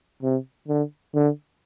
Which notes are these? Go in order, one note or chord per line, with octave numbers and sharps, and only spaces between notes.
C3
D3
D3